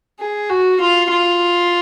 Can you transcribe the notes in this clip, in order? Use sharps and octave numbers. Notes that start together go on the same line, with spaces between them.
G#4
F#4
F4
F4